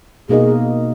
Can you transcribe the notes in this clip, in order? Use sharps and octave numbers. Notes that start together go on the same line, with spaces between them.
B2 A#3 D#4 G#4 A#4 D#5